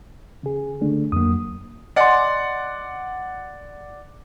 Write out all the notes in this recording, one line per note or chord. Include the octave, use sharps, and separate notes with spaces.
C#3 G#4
D3 A3 D4
F2 F#3 A#3 D#6
D5 D#5 F#5 G#5 C6